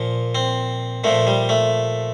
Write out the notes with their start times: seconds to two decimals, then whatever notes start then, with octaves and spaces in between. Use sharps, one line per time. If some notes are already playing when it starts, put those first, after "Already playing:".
Already playing: A#2 F3
0.35 C4
1.04 A#2 F3 A3
1.27 G3
1.49 A3